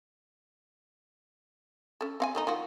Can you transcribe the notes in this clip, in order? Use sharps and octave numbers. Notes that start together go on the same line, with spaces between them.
C#4 A4
C4 F5 G#5
D#3 A3 D#4
D#3 F4 F#4